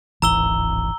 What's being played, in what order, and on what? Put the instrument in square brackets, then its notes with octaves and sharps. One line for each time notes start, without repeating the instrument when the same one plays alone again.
[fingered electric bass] D1 G#1 E3 [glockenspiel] A#5 E6 G7